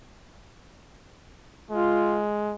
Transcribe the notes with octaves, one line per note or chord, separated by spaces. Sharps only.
G#3 F4